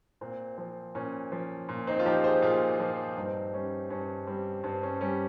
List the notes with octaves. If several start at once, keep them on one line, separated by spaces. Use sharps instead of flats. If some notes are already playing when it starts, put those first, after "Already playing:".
A#2 C4
F3
A#2 C#4
F3
A#2
C4 D#4
F4
F3 D#4 G4
G#4 C5
A#2 F4 G#4
F3
G2 C4 D#4
G3 C#4
G2 C#4
G3 C4
G2 C4
C#4
G3 C#4